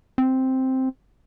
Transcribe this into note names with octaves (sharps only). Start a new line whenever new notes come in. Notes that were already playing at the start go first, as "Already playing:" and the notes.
C4